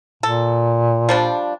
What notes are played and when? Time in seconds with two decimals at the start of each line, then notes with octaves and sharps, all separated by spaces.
0.23 A#2 A4
1.09 F3 G3 D4